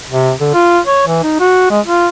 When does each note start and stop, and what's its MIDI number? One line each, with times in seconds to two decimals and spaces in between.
0.10 0.32 48
0.41 0.51 50
0.54 0.79 65
0.87 1.05 73
1.07 1.21 52
1.23 1.37 63
1.40 1.69 66
1.71 1.80 56
1.85 2.08 65